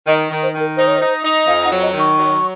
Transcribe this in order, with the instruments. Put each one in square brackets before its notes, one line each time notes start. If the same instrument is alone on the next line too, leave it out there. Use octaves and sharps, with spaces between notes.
[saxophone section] D#3 [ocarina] D#5
[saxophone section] D#3
[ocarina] C5
[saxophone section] D#3
[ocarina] A#4
[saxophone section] D#4 [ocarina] C5
[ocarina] C#5
[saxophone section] D#4 [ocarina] C5
[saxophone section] D#4
[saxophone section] F2 [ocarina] F5
[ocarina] F#5
[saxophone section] F#3
[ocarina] D#5
[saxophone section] D#3
[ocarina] C#6
[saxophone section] F#3